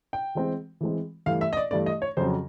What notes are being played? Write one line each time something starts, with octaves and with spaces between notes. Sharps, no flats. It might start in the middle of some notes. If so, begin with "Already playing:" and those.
G5
E3 G#3 C4
E3 G#3 C4
G2 E3 A3 F5
E5
D#5
D5
G2 E3 A3 D5
D#5
C#5
F2 C#3 F#3 C5